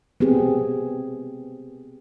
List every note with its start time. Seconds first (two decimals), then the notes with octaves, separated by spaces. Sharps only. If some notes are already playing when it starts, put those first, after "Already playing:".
0.20 B3 C4 G4 G#4